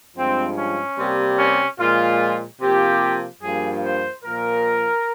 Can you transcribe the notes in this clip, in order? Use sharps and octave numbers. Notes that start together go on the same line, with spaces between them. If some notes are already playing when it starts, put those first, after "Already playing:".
G2 F3 G#3 C4
C#4
C3 G3 A#3
C#4
A#2 F3 G#3 F4
C3 F3 A#3 G4
G2 F3 A#3 G#4
C5
A#2 F3 A#3 A#4